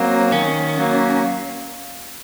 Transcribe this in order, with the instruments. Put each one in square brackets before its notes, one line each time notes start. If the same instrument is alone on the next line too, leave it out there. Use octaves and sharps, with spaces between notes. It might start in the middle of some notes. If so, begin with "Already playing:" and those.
Already playing: [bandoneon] F#3 A#3 [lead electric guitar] C4
[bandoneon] D#3 [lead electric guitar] C#4
[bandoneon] F#3 A#3